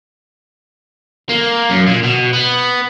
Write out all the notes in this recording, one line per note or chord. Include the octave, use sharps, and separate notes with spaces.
A#3
F#2
A#2
B2
B3